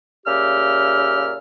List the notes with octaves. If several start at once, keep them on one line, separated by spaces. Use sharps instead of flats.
A#2 C#3 G4 E5 F6